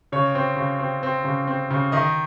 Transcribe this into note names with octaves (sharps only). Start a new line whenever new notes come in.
C#3 C#5
C4
C#3
C4
C4
C#3
C4
C#3
D#3 D#5